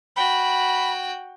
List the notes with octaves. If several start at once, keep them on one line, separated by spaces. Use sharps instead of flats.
F#4 G5 B5